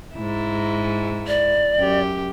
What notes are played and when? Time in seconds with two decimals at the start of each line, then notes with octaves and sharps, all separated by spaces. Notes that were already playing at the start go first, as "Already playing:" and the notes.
0.15 G#2 E4
1.28 D5
1.78 F#2 G4